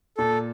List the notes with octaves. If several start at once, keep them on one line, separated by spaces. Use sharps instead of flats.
A#2 A4